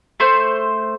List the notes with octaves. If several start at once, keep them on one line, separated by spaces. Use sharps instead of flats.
A3 C5 C6